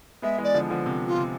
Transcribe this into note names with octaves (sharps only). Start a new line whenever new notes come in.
G#3 B3 E5
E3 G#3
D5
D3 F3
D3 F3
C3
F4
C3